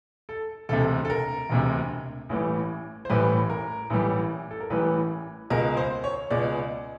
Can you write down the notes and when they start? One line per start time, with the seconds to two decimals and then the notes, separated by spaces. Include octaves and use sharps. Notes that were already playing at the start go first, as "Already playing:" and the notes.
0.29 A4
0.69 E1 D2 C3 A4
1.05 A4
1.10 A#4
1.49 E1 D2 C3
2.29 A1 A2 E3 G3
3.05 C5
3.10 A1 A2 E3 G3 B4
3.50 A#4
3.90 A1 A2 E3 G3
4.51 A4
4.60 A#4
4.70 A1 A2 E3 G3 B4
5.50 C#2 B2 G#3 A#4
5.77 C5
6.04 C#5
6.31 C#2 B2 G#3 D5